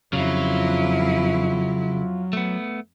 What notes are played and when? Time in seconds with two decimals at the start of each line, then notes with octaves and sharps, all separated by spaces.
0.13 F2 C#3 F#3 E4 F4
2.33 A3 B3